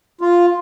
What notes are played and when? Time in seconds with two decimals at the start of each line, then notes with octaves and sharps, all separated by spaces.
0.21 F4